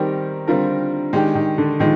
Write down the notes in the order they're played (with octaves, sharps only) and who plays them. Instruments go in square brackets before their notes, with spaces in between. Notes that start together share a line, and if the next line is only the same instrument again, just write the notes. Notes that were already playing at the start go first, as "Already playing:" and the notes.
Already playing: [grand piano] D#3 [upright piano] G3 C4 G4 A#4
[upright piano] D3 G3 C4 F4 A#4
[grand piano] D#3 [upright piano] G#3 D4 G4
[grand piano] D#3
D3
[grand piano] D#3 [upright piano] F3 G#3